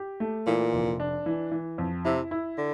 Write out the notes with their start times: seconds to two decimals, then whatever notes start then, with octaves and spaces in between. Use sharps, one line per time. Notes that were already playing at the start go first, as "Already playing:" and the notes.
Already playing: G4
0.20 A3
0.47 A#2 E3
0.73 F1
1.00 D4
1.26 E3
1.52 E3
1.78 F2
2.05 C3 E4
2.31 E4
2.58 D3